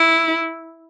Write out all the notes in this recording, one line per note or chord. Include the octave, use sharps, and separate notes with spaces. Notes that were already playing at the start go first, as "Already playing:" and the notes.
Already playing: E4